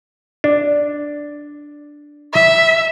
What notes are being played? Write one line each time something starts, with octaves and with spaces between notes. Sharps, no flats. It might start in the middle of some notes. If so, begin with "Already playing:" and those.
D4
E5